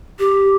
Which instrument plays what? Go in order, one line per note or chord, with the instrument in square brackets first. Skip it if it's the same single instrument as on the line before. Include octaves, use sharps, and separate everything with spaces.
[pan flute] G4